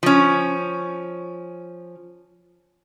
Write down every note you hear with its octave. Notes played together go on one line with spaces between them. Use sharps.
F3 C#4